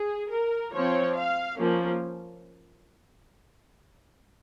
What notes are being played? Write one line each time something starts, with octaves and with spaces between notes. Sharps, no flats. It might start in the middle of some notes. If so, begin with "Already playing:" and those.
Already playing: G#4
A#4
F3 C4 C#5
F5
F3 A#3 C#4